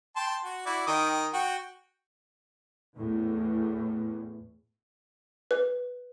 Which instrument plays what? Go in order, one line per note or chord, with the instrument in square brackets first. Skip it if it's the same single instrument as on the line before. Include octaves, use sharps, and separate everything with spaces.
[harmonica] G5 A5 C6
F#4
E4 F#4 D5
D#3 G5 D#6
F#4 G5
[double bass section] E2 A2
[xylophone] B4